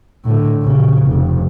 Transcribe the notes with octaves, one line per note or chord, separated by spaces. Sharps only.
A2 D3
A#1 C#3
F1